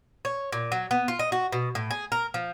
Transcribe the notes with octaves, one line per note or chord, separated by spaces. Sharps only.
C#5
A#2
F#3
B3
F4
D#5
F#4
B2
A2
G#4
A#4
F3